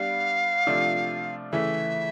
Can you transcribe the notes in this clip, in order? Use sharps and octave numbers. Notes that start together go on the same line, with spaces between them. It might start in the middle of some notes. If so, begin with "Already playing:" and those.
Already playing: G3 B3 D4 F5
C3 F3 A3 D4 F4
C#3 E3 A3 E5